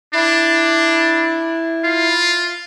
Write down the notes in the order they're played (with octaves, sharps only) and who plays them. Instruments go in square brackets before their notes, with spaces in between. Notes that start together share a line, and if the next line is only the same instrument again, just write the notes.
[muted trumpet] D4 [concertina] E4
[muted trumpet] F4